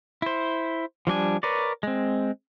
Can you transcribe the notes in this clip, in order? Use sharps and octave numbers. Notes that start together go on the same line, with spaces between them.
E4 C5
F3 G3 D4 G#5
A#4 B4 C#5 D5
G#3 C4